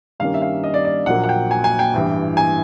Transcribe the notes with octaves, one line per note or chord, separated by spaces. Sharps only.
G2 D#3 G3 A#3 C#4 F5
E5
F5
D#5
D5
D5
A#1 A#2 F#3 A#3 F#5
F#5
G5
G#5
G#5
G5
A1 G2 E3
G#5